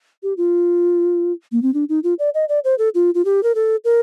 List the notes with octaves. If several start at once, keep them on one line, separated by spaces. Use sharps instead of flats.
G4
F4
A#3
C4
D4
D#4
F4
D5
D#5
D5
C5
A4
F4
F4
G4
A#4
A4
A#4